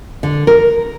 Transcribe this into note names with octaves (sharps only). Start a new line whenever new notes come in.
D3
A#4